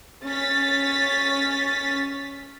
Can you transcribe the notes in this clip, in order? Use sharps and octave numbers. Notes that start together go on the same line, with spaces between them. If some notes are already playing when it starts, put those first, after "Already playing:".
C#4 A6 B6